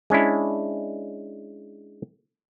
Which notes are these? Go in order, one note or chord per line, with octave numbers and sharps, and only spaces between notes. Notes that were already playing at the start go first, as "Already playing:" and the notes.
G#3 C#4 D4 E4